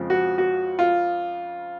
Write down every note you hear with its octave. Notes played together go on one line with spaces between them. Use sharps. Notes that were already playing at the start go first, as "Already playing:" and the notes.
Already playing: F2 C#3 F3 G#3 C4
F#4
F#4
F4